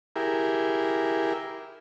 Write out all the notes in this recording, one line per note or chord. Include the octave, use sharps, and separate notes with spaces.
E4 G4 G#4 A#4